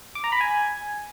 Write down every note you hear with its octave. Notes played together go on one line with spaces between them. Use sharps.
D6
A#5
B5
G#5